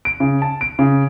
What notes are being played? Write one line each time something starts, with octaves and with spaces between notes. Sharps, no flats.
D7
C#3
A5
D7
C#3